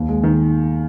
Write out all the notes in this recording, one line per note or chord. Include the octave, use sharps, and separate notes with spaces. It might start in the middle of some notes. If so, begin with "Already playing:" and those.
Already playing: D#2
G#3
D#3